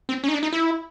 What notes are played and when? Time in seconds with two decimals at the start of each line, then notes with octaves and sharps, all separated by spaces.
0.09 C4
0.24 C#4
0.28 D#4
0.34 D4
0.43 D#4
0.53 E4